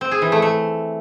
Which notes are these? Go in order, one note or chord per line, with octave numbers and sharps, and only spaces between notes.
C4
G#4
E3
A3
A3